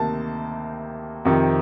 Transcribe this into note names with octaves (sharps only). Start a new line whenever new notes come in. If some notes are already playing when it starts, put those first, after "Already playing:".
Already playing: D2 C3 D#3 A#3 A5
F2 C3 D#3